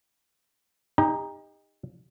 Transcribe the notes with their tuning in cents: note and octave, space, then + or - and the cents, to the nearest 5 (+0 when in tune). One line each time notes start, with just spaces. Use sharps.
D#4 +0 G4 +40 A#5 +30